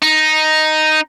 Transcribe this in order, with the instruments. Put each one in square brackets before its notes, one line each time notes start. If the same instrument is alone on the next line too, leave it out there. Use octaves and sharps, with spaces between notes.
[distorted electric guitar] D#4